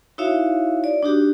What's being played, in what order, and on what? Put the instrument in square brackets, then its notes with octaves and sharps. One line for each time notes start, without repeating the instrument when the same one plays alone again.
[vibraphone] D#4 E4 F#4 C#5 E5 F5
D5
D4 D#4 F#4 G4